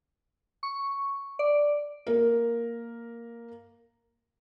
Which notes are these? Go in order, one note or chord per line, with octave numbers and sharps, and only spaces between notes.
C#6
D5
A#3 A#4